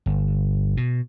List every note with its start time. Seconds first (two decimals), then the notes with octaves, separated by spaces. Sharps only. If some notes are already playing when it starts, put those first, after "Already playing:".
0.06 G1
0.77 B2